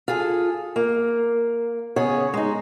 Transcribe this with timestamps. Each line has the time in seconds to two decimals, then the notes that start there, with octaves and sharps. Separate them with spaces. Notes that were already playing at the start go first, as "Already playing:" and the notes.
0.08 F4 G#4 A4
0.76 A#3
1.96 C#3 B3 G#4 C#5
2.34 G#3 D#4